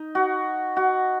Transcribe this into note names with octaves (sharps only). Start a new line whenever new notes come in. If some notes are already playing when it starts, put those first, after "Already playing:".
Already playing: D#4
F#4
F#4